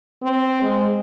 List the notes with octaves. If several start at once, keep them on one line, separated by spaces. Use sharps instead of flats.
C4
G#3